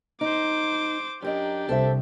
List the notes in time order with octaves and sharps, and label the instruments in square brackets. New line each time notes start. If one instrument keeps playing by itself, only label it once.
[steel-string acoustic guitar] D#4 [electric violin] C5 D6
[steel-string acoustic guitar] F#2 A#4 D#5 [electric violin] D4 G4
[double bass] C2 [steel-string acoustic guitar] A4 C5 E5